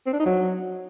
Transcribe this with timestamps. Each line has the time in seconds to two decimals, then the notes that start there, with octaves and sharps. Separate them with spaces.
0.06 C4
0.13 D4
0.19 D#4
0.26 F#3